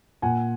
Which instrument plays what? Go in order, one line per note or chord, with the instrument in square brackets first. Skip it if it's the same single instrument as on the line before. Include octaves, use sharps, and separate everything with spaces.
[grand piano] A#2 F#5 G#5